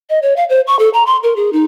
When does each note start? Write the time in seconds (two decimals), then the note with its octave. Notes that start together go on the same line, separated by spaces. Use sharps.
0.10 D#5
0.22 C#5
0.36 F5
0.49 C5
0.67 C#6
0.79 A4
0.93 A#5
1.06 C6
1.23 A#4
1.36 G#4
1.53 D#4